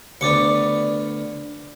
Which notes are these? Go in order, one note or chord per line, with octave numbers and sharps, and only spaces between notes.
D2 B3 D5 D6 C#7